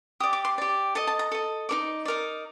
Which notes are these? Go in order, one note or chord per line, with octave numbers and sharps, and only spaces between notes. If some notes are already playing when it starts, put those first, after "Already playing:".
G4 D5 D#6
D6
C6
G4 D5
A4 D#5 A5
A5
A#5
A4 D#5
D#4 A#4 D5
D#4 A#4 D5